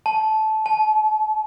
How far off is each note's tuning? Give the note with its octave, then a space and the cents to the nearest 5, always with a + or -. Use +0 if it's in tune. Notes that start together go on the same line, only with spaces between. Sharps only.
A5 -15
A5 -40